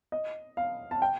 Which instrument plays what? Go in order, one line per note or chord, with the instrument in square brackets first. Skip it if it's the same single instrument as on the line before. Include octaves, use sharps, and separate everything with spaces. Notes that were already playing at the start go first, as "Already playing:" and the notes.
[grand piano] D#5
F5
A5
G5